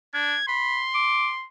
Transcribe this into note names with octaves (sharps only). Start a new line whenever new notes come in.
D4 G#6
B5 C6
D6